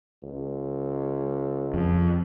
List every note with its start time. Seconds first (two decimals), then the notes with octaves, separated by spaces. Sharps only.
0.23 C#2
1.74 F2